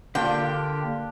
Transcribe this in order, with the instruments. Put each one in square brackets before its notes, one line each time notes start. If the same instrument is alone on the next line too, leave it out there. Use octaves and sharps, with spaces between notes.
[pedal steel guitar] D3 A#3 G4 [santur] D4 F4 [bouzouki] G5